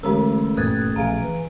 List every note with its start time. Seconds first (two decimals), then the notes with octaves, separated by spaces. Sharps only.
0.03 A1 D3 G#3 A#4 B5 E6
0.57 G1 A#2 D#3 E3 D#6 F#6 G#6 A6
0.96 A#1 B2 G#4 F5 G#5 A#5 D7
1.22 E3